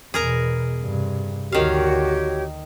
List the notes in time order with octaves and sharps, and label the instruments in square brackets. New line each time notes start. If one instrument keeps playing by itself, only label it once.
[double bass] E2 B2 [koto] G#4 A#4 A#5
[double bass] G2 C3
[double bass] D2 [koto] D#3 F5 [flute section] F#4 G4 C#5